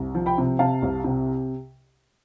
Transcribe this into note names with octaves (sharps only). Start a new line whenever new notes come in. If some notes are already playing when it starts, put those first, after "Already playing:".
Already playing: C2
F3
G5 B5
C3
C3 F5 A5
C2
C3